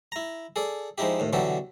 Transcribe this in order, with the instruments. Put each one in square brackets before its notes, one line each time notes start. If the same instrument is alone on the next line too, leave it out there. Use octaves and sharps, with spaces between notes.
[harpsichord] E4 A#5
G#4 A4 D5
F3 G#3 D#4 E4 G4
D#2 A2
B2 D3 E3 F#3 G4 A4